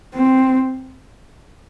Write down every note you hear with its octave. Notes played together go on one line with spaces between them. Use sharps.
C4